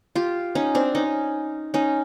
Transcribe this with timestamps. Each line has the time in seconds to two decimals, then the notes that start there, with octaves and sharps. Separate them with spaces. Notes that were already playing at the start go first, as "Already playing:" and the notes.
0.16 F4 G4
0.55 C#4 D#4
0.75 C4 D4
0.95 C#4 D#4
1.74 C#4 D#4